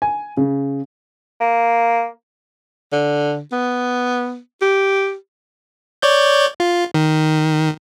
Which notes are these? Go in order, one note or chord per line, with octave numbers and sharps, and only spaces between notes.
G#5
C#3
A#3
D3
B3
G4
C#5 D5 G6
F4
D#3